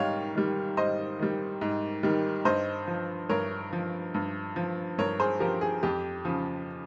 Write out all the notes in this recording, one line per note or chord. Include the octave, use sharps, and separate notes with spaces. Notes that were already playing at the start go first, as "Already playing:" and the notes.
Already playing: G#2 D#3 G3 C#5 F5 G5
D#3 G3
G#2 C5 D#5
D#3 G3
G#2
D#3 G3
G2 C5 D#5
F3
G2 A#4 C#5
F3
G2
F3
G2 A#4 C#5
G#4 C5
F3 G4 A#4
G#4
F2 G4
C#3 F3